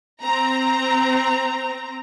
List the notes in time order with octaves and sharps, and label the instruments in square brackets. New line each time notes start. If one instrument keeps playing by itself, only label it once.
[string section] C4 A#5